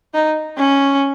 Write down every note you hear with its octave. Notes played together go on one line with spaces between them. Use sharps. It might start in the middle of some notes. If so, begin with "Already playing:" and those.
D#4
C#4